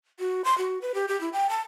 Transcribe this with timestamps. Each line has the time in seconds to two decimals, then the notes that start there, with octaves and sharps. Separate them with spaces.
0.19 F#4
0.44 C6
0.58 F#4
0.82 B4
0.94 G4
1.08 G4
1.21 E4
1.33 G5
1.49 A5